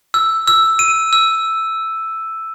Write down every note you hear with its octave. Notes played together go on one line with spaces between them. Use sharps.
E6
E6
D#7
E6